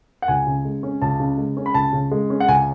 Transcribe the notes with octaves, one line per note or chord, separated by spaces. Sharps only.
F#5
C#2 G#5
C#3
G#3
C#4
C#2 A5
C#3
G#3
C#4
B5
C#2 A5
C#3
G#3
C#4
F#5
C#2 G#5